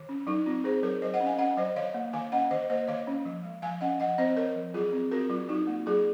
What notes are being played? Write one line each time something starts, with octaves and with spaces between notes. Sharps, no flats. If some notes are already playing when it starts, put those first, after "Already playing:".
Already playing: D#3
C#4
F#3 D#4
C4 F4
C4 G#4 C5
F#3 A#4 C#5
F#3 C5 D#5
D#5 F#5
C#4
F5 G#5
C#4 D#5 F#5
F#3 C5 D#5
D#3 C#5 F5
A#3
D#3 F5 G#5
C#4 D#5 F#5
D#3 C5 D#5
A#3 C5 D#5
D#3 C#5 F5
C#4
F3
G#3
F3 F5 G#5
C#4 D#5 F#5
F3 D#5 F#5
C4 C5 D#5
C4 A#4 C#5
F3
F#3 F4 G#4
C4
C4 F#4 A#4
F#3 F4
F#3 D#4 F#4
A#3
F#3 F4 G#4